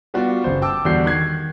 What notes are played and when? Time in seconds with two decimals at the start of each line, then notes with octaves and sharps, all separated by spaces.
0.14 G3 B3 D4 F4 F#4 D5
0.44 F#1 C5
0.62 G5 A5 D6 E6
0.85 E2 D3 G3 F#4 G6 C7
1.05 D#3 F#6 G#6 C7